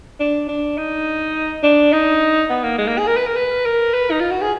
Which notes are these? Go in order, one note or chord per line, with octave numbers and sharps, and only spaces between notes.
D4
D4
D#4
D4
D#4
B3
A#3
G#3
A#3
G#4
A#4
B4
A#4
B4
A#4
B4
D#4
F4
F#4
G#4